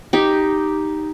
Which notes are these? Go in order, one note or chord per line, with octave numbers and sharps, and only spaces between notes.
D#4 G4